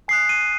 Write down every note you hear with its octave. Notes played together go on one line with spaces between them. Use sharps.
G#5 D#6 F#6 C7
D#7